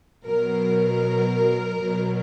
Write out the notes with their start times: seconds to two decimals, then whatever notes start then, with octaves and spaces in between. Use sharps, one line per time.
0.25 B2 F#3 A#4
1.78 B2 F#3